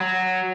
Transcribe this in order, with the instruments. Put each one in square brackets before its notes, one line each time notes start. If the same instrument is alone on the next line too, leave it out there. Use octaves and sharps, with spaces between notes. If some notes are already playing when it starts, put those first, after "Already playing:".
[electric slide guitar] F#3